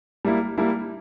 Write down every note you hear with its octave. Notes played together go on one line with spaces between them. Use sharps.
G3 A#3 E4
G3 A#3 E4